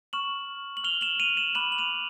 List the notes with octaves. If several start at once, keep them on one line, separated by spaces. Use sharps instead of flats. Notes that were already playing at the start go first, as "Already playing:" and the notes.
C#6 F6 E7 F#7
F#7
C#6 F6 F7 G7
E7 F#7
D#7 F7
E7 F#7
B5 D6 F#6 E7 F#7
F#7
D#7 F7